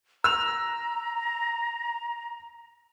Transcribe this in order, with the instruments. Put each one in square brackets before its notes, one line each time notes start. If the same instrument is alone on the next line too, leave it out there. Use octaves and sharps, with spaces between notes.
[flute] A#5 [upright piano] E6 F7